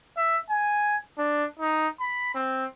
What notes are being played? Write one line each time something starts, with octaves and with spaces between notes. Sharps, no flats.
E5
G#5
D4
D#4
B5
C4